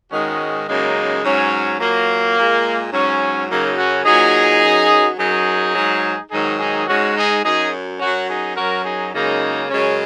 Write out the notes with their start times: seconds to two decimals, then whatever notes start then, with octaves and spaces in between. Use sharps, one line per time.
0.10 G#2 D#3 G#3 C#4 F#4
0.67 F#2 C#3 G#3 A#3 D#4
1.23 G#2 F#3 C#4
1.79 A#2 F#3 A#3
2.37 A#2 G#3
2.92 G#2 F#3 C#4
3.48 F#2 C#3 F#3 A#3 D#4
3.77 C#4 F#4
4.05 F#3 D#4 G#4
4.10 A#2
4.62 F#2 F#3
5.18 F#2 F#3 D#4 G#4
5.75 G#2 F#3
6.30 G#2 D#3 F#3 D#4 G#4
6.59 D#4 G#4
6.87 G#2 G#3 C#4 F#4
7.15 D#4 G#4
7.43 F#2 F#3 D#4 G#4
7.99 F#2 F#3 C#4 F#4
8.28 D#4 G#4
8.56 F#2 F#3 F#4 A#4
8.84 D#4 G#4
9.13 F#2 C#3 G#3 A#3 D#4
9.69 F#2 C#3 G#3 C#4